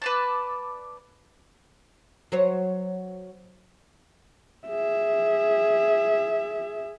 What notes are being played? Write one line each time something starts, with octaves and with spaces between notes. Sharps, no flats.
B4 D5 A5
F#3 C5 C#5
G#4 E5